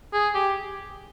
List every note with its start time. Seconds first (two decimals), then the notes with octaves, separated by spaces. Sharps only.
0.13 G#4
0.35 G4